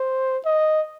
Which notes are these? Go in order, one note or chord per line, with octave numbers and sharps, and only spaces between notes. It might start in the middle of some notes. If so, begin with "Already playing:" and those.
Already playing: C5
D#5